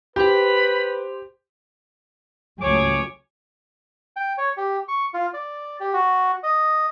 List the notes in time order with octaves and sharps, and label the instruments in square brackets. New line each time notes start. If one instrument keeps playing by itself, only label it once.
[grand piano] G4 [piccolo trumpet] B4 [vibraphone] C5 C6 [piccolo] B5
[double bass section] C#2 F#3 A3 [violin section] G#4 C#5 [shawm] D6
[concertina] G5
C#5
G4
C#6
F4
D5
G4
F#4
D#5